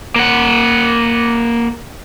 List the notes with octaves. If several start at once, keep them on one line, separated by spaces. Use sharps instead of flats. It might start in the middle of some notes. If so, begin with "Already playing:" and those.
A#3 F#5